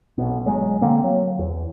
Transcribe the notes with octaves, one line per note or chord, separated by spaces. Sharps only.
B1 B2
G1 F#3 G#3
D3 A#3 C4
F#3
E2